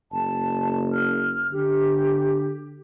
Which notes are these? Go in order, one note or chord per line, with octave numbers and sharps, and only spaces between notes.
F#1 A5
F6
D3 G4